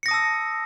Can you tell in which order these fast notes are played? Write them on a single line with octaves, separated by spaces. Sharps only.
C#7 A#6 D#6 A5 E6